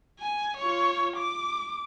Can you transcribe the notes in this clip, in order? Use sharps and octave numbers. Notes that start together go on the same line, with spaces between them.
G#5
F4 C#5
D6